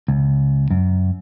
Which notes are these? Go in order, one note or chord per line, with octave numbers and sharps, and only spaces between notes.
C#2
F#2